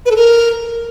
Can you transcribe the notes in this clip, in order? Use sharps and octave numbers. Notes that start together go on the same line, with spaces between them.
B4
A4
A#4